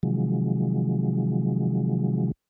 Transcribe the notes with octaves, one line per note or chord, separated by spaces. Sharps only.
C3 D#3 F3 F#3 G#3